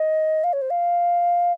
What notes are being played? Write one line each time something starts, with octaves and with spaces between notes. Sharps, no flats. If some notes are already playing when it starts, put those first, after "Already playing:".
Already playing: D#5
F5
C#5
C5
F5